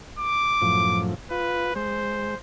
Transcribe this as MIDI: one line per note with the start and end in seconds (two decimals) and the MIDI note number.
0.19 1.02 86
0.62 1.14 42
0.62 1.14 45
0.62 1.14 53
1.31 1.72 65
1.31 1.74 71
1.76 2.35 56
1.76 2.36 72